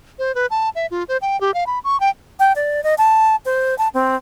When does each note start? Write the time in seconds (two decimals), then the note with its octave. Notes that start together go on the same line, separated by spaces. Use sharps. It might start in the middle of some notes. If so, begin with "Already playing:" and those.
0.19 C5
0.35 B4
0.51 A5
0.75 E5
0.91 F4
1.08 C5
1.22 G5
1.41 G4
1.54 F5
1.67 B5
1.84 C#6
2.00 G5
2.40 G5
2.56 D5
2.84 D#5
2.98 A5
3.45 C5
3.78 A5
3.94 C4